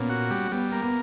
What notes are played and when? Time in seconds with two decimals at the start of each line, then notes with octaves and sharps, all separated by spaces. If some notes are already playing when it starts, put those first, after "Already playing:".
Already playing: A#2 B3 C#4
0.10 F#4
0.30 G3
0.52 G3 B3
0.72 A#3
0.83 B3